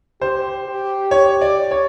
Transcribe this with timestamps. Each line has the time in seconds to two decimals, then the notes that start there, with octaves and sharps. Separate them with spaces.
0.22 G4 C5
0.66 G4
1.11 C#5
1.41 D5
1.71 C#5